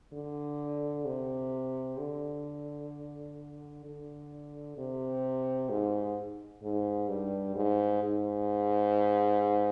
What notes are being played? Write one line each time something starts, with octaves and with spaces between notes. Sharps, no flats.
D3
C3
D3
D3
C3
G#2
G#2
G2
G#2
G#2